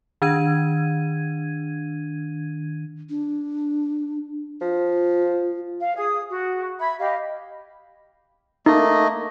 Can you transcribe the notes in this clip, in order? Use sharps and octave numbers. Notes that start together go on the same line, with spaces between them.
D#3 D4 G#6 D#7
D4
F3 F4
F5
G#4 D#6
F#4
E5 B5 G#6
G4 D#5 F5 B5
A3 A#3 D#4 D#5